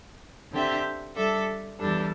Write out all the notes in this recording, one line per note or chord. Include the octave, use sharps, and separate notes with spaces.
D3 C4 G4 E5
G3 D4 A4 E5
E2 E3 G3 D4 A4